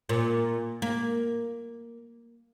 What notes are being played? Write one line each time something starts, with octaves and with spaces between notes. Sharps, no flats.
A#2
A#3